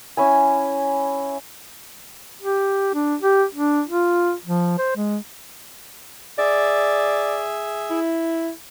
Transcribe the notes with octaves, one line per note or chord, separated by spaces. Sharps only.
C#4 E4 G#5
G4
D4
G4
D4
F4
F3
C5
G#3
G#4 D5 E5
E4